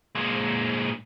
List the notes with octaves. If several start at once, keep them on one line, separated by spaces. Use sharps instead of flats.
A#2 G#3